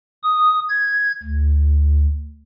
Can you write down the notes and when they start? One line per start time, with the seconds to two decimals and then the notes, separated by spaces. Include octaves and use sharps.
0.23 D#6
0.69 G#6
1.23 D2